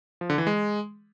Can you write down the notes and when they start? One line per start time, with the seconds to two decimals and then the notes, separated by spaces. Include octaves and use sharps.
0.21 F3
0.30 D3
0.38 E3
0.47 G#3